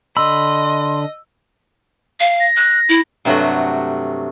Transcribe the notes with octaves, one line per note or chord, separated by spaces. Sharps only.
D3 D#5 B5 C6 E6
F5
A#6
F#6
E4
G2 C3 F#3 A3 F#4 B5